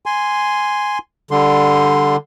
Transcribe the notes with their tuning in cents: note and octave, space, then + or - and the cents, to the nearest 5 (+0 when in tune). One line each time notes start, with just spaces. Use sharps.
G#5 +0 C6 -5
D3 +0 G3 +0 C6 +0